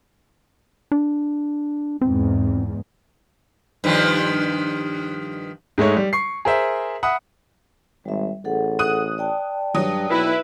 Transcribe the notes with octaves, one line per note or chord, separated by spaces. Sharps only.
D4
E2 G#2 C4
G2 D#3 F3
G#2 G#3 A3 C#5
G3
C#6 C7
G#4 A#4 C5 E5
E5 F#5 B5 D#6
G#1 G3 E5
A1 G#4 A4 F#5
D#6 F#6 D#7
D5 G5 A5
G2 F#3 D#6
B1 E4 B4